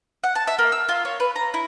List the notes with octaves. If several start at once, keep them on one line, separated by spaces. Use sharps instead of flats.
F#5
A5
E5
A#3
E6
F4
C#5
B4
A#5
E4